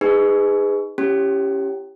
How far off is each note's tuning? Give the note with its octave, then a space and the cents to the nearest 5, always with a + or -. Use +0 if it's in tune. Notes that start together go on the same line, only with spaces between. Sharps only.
D#4 +0 G#4 -20 B4 +25
C#4 +0 E4 +40 G4 +0